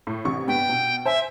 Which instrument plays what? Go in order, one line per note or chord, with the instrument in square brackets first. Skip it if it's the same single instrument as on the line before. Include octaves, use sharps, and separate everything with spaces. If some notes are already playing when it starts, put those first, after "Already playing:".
[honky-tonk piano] A2
A1 C3 C#6
[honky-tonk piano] G2 B3 [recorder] G5
[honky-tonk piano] B2
[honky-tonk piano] C5 G#5 [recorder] E5